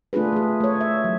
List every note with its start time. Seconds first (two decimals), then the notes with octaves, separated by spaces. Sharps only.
0.13 A3 D4 F4 G#4 B4
0.33 A3 G#4
0.60 A3 C#5
0.81 E5
1.04 F#3